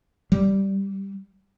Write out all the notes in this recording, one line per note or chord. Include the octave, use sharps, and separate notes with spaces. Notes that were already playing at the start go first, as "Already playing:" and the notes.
G3